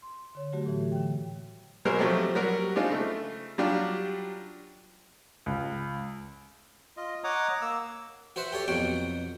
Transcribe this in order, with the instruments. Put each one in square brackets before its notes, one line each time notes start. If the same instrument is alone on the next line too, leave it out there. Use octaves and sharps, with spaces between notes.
[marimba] C6
D3 C#5
D3 F#3 A3 F#4 G4
A2 E3
D3 G5
[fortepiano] B2 F#3 G#3 A#4 C5
F3 F#3 A3 C4 G4
F#3 G3 F#4 A#4
G#3 C4 D4 D#4 F4
C#3 A3
F#3 G3 D4 F4 G4
[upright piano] C#2
[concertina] F4 D#5
C#5 D#5 F#5 A#5 D6 D#6
A#3 E6
[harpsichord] F#4 B4 C5 E5 F#5
G4 A4 C#5
F2 B2 F#3 F#5 G5